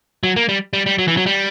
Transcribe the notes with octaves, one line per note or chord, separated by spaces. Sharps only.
F#3
A#3
G3
G3
G3
F#3
E3
F#3
G3